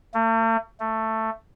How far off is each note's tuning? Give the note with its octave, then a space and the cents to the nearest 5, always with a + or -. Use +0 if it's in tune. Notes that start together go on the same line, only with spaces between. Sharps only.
A3 +45
A3 +10